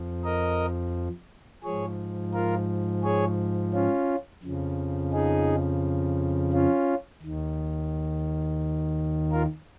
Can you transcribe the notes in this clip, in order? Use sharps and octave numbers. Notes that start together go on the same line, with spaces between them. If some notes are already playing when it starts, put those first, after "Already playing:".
Already playing: F2 F3
A#4 D#5
G#2 F3 G#4 C#5
F4 A#4
G#4 C#5
C#4 F4
F2 C#3 F3
D#4 G#4
C#4 F4
D#2 D#3
F4 A#4